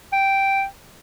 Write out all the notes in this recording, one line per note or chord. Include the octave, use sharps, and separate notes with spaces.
G5